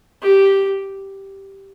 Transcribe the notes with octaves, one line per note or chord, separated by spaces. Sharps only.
G4